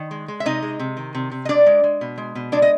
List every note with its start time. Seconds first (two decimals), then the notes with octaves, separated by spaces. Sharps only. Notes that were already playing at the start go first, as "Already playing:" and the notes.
Already playing: D#3
0.11 G#3
0.28 G#3
0.40 E5
0.46 C3 D#4 D#5
0.62 G#3
0.79 C3
0.97 D#3
1.15 C3
1.31 C3
1.45 D#5
1.49 G#3 D4 D5
1.66 G#3
1.84 G#3
2.01 B2
2.18 G#3
2.35 B2
2.52 G#3 D4 D5
2.62 D#5